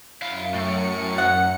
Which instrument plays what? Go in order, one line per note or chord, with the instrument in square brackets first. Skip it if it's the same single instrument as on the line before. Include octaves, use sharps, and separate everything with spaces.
[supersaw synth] F#2 C#7 [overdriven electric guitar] E4 F5
[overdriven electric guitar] A2 A3
[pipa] F#5